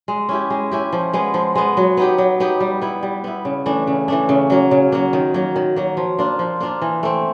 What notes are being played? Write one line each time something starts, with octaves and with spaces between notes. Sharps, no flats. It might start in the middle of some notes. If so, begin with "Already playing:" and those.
G#3
C#4 E4 G4
G#3
C#4 E4 G4
F3
G#3 B3
F3
G#3 B3
F#3
B3 D#4 G4
F#3
B3 D#4 G4
G3
B3 E4
G3
B3 E4
C#3
E3 A3 D4
C#3
E3 A3 D4
C#3
F#3 A#3
C#3
F#3 A#3
D#3
F#3 A#3
D#3
F#3 A#3
F3
A#3 D4 F4
F3
A#3 D4 F4
E3
A3 C4